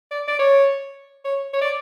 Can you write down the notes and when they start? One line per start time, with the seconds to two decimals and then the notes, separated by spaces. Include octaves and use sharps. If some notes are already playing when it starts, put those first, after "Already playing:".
0.11 D5
0.28 D5
0.39 C#5
1.25 C#5
1.53 C#5
1.61 D5